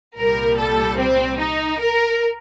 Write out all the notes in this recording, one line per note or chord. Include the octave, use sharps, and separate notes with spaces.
C2 A#2 G3 A#4
A4
C4
D#4
A#4